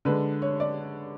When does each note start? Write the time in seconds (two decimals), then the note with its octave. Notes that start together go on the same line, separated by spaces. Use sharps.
0.05 D3 G#3 B4
0.42 C#5
0.60 D5